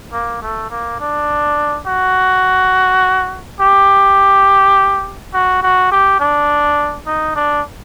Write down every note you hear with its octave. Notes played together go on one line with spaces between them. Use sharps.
A#3
A3
A#3
D4
F#4
G4
F#4
F#4
G4
D4
D#4
D4